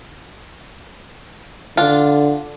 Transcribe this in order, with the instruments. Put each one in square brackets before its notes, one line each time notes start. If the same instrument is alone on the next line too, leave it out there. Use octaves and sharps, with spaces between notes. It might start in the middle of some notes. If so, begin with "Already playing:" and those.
[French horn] D3 [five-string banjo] D4 F4